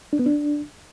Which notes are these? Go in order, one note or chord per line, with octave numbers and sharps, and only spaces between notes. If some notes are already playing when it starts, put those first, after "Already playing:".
D4
B3
D4